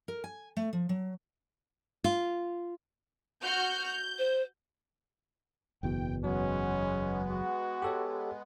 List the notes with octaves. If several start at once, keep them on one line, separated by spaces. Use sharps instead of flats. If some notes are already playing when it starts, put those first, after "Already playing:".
A#4
G#5
A3
F3
F#3
F4
F#4 F6 G6
G6
C5
F#1 E2 B2 G5
F#3 G#3 B3 C#4
F#4
G4 A4 C#5